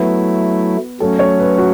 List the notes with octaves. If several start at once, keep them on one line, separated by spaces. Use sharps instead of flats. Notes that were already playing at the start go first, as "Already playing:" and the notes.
Already playing: F#3 A3 B3 E4
F#3 A3 C#4 A4
C#5
B4
F#4